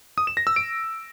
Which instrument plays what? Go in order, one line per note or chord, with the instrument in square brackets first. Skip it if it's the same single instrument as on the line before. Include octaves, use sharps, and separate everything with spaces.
[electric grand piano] D#6
E7
A#6
E6
D7